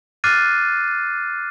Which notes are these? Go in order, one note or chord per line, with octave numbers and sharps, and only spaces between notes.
D6 F6 F#6 A6 C7 D#7